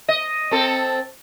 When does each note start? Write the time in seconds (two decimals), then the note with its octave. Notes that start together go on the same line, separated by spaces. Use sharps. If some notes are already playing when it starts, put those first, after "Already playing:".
0.08 D#5
0.51 C4 A4